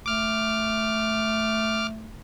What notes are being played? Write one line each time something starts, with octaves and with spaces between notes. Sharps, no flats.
A3 D6 F6